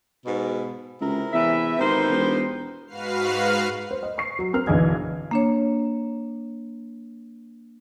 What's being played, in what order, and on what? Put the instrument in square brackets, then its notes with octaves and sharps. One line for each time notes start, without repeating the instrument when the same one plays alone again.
[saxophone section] G#2 B2
[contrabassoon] C#2 [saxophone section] C3 E4 A#4
[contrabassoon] E2 [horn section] E3 E5
[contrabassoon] G#1 [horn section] B3 G4 C5 [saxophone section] D#4 A#4
[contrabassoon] E1
[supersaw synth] G#2 F#4 B4 F5 F6 C7
[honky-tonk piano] C5
D#5
C#6 C7
F#3
C4 A#4 F6
B1 D3 E3 G#4 D#5 G#6
[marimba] A#3 D4 C#5